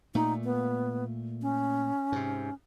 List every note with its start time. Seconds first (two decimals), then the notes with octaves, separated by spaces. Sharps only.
0.15 A#2 A3 D#4
0.44 B3
1.42 C#4
2.12 G#2 C3